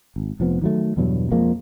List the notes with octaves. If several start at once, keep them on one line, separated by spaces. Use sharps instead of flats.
G#1
F1 F3 B3
D#3 F#3 A3
E2 G2 B2 F#3
F2 F3 G#3 A#3